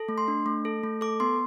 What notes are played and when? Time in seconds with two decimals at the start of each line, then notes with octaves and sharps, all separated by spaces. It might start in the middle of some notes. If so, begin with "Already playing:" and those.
Already playing: A4
0.09 A3
0.18 C6
0.28 D4
0.46 A3
0.65 A4
0.83 A3
1.01 A4 D6
1.20 B3 C6